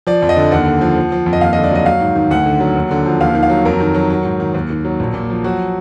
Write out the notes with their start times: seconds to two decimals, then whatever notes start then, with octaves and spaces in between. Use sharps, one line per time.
0.07 F3 D5
0.22 F2
0.29 D#5
0.36 D3
0.52 D#2 F#5
0.66 D3
0.81 F3
0.96 F3
1.12 F3
1.26 F2
1.33 D#5
1.41 D#2 F5
1.53 D#5
1.56 D3
1.64 D5
1.71 F#3 D#5
1.86 F#3 F5
2.01 G#2
2.15 D#3
2.31 D2 F#5
2.46 D3
2.60 F#3
2.76 D#2
2.91 D3
3.06 F3
3.20 D#2 F5
3.35 D#3
3.43 F5
3.50 F#3
3.65 F2 A#4
3.80 D#3
3.95 F#3
4.10 F#3
4.25 G#2
4.40 D#3
4.54 D#2
4.70 D#3
4.85 F#3
5.00 A#1
5.14 A#2
5.30 F3
5.44 F#3 F#4